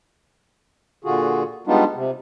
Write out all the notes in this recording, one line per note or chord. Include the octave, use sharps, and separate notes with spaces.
A#2 D3 F4 F#4 G#4
G3 G#3 B3 D4 D#4 F4
C3